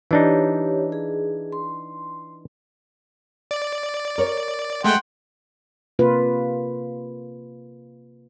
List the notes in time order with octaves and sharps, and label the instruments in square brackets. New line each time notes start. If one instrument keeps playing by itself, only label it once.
[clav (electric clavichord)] E3 D4 D#4 [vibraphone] G4 C#5
[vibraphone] G#4
C6
[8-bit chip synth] D5
[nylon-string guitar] A#4 C#5
[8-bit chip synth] G#3 A3 [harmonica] F#5 G5 C6
[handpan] C3 A#3 F4 B4